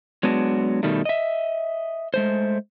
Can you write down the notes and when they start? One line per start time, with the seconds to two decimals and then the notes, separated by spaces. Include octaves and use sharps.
0.23 F#3 G#3 B3 D4 F#4
0.83 B2 D#3 G3 A3
1.05 D#5 E5
2.14 G#3 A3 C5